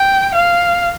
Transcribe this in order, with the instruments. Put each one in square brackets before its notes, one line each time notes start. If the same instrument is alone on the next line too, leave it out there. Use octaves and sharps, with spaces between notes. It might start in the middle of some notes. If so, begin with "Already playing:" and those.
Already playing: [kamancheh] G5
F5